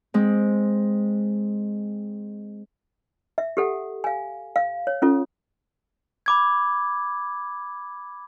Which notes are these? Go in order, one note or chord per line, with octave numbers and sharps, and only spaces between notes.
G#3 C4
E5
G4 A4 F#5
F5 G#5
F5
C#5
C#4 F4 A4
B5 D6 G#6